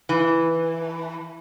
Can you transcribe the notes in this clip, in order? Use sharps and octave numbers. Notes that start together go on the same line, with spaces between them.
E3